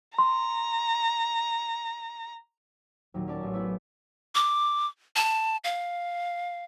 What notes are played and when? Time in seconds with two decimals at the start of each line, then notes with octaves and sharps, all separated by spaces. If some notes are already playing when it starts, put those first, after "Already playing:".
0.18 A#5 C6
3.14 D#2 A#2 F#3
3.28 C#4 A#4 D5 A5
3.41 A1 G#5
3.53 A3 B3 E4 B4
4.35 D6
5.16 A5
5.64 F5